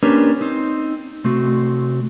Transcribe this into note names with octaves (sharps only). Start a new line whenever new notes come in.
A#3 C#4 D4 G4 A#4 B4
C4 D#4
C3 A3 C4 F#4